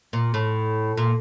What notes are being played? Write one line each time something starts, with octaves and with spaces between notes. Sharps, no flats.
A#2
A2
A#2